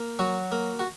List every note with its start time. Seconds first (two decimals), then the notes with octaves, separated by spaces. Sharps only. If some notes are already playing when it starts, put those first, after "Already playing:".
Already playing: A#3
0.19 F#3 F#4
0.52 A#3
0.79 F#4